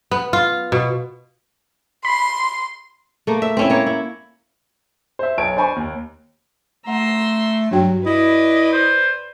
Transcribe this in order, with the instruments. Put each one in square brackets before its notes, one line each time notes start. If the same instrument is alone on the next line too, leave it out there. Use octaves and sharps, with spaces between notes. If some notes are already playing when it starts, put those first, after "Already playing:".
[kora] B3
F4
B2
[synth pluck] B5 [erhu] C6
[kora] A3 A#3
E5
C4 C#4 E4
A#3 C#5
E4
[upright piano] C5 E5
B1 B4 C#5 A5 D7
D4 C5 D5 G#5 B5 C#6
D#2
[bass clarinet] A3 [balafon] F#5 [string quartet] A#5 C6 E6
[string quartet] G2 [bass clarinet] F#3 [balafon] D4 F#4 G5
[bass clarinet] E4 [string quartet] B4 D5 [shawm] D#5
[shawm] C5